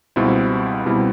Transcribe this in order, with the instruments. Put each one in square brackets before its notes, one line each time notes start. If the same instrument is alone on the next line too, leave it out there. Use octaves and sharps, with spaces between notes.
[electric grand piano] C#2 B2 G3 C4 E4
C#2 B2 G3 C4 E4